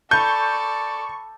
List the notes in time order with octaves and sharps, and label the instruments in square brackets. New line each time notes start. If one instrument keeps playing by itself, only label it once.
[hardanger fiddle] A4 D5 [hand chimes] A5 B5 [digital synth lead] C#6 [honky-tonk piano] G6